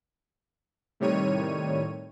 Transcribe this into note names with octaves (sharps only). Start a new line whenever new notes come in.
A2 C3 D#3 G3 C#5 D#7